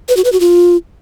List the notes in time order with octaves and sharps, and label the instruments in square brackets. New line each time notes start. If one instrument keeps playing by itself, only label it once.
[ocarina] B4
F#4
B4
F#4
F4